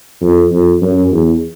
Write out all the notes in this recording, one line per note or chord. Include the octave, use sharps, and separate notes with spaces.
F2
F2
F#2
E2